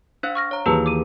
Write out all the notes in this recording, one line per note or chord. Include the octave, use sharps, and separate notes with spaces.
D4 C5 F5 F#6
C#6 F6 A#6
C#5 A#5
D#2 E3 F#4 G#4 B4 A5 A#5 E6
D6 D#7